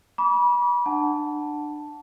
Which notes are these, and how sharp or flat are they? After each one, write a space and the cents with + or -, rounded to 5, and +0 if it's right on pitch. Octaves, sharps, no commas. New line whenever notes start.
B5 -35 D6 -35
D4 +25 F#5 +0 A5 +0